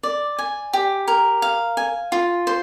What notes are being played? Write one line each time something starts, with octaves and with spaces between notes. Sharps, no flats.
D5
G#5
G4
A#4
F5
G#5
F4
C5